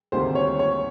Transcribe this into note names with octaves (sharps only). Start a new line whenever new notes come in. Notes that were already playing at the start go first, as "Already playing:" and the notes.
D2 C3 D#3 G3 A#3 C5
C#5
C#5